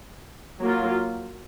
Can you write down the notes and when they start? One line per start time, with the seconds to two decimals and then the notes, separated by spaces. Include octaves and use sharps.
0.62 F#3 A#3 F4